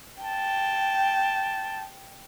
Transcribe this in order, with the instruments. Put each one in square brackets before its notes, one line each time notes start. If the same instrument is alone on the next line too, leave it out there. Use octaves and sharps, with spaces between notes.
[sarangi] G5 [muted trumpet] A5